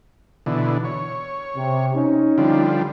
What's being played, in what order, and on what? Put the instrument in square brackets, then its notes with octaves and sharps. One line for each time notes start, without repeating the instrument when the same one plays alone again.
[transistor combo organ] B2 D3 E3
C#5
[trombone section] C3
C#4 D#4
[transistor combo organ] D3 F3 G3